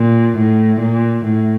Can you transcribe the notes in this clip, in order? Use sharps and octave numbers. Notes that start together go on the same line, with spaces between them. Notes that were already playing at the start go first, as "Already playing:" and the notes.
Already playing: A#2
A2
A#2
A2